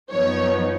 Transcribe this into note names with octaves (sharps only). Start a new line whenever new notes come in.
F#2 F3 B3 D#4 C#5